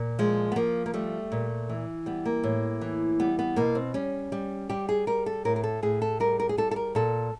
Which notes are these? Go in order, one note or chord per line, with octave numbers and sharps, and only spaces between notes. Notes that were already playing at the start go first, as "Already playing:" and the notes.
Already playing: A#2
F3 G#3
B3
F3 A#3
A#3
G3 A3
A#2
E3
G3 B3
A#3
A2
E3
G3 B3
B3
B2 A#3
C4
G3 C#4
G3
G3 G4
G#4
G3 A#4
A4
A2 A#4
A#4
A4
A2 G#4
A4
G3 A#4
A#4
G#4
G3 A4
A4
A#4
A#2 A4